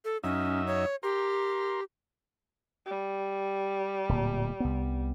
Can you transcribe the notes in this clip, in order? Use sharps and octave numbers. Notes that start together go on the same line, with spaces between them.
A4
F#2 C#4 D#4 E5
C#5
G4 A#4 C6
G3
D1 A#2
C2 B3